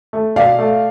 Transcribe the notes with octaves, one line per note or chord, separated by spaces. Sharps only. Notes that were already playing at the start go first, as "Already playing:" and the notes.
A3
B2 D5 F5
A3